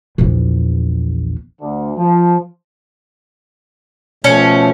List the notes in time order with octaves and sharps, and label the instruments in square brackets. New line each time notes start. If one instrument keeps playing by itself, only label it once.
[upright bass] A#1 E2
[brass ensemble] D2
F3
[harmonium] B2 F3 A3 [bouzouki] C#4